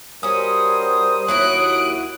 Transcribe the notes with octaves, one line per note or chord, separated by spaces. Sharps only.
G3 C#4 F#4 A#4 C5 D#6
D#2 F#3 E4 F#4 F#6 D7